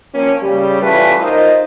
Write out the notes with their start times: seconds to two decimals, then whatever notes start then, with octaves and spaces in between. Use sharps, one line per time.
0.14 F3 A#3 C4 C#4
0.43 C#3 G3
0.82 E3 G3 A3 C#4 F4 B4
1.20 D#4 F4 A#4 C5 D#5